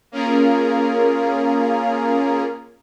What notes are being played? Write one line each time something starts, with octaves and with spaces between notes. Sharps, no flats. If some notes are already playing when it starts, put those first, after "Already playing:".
A#3 C#4 F4 G#4 A#4